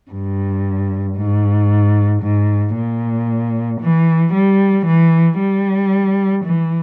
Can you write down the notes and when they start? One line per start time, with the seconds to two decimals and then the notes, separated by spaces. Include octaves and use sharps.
0.11 G2
1.16 G#2
2.22 G#2
2.75 A#2
3.81 E3
4.33 G3
4.86 E3
5.39 G3
6.45 E3